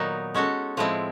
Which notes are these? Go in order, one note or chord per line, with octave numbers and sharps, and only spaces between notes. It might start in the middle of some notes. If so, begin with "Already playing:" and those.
Already playing: A#2 D#3 F#3 B3 D#4
G#3 C#4 F#4 A4
A2 F3 G#3 C4 E4